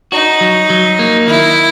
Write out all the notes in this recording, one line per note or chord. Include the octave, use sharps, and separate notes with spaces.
D#4 F#4
F#3
F#3
A#3
D#3 E4